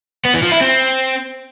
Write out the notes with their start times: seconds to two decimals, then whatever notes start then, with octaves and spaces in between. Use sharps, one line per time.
0.25 B3
0.34 E3
0.43 F3
0.52 E4
0.61 C4